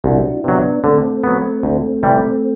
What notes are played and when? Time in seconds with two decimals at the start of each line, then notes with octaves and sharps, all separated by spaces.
0.04 C2 D4 F#4
0.34 E4
0.44 C3 F#3 B3 D4
0.84 D3 A3 C4
1.24 F#3 B3
1.63 D2
2.03 C3 E3 G3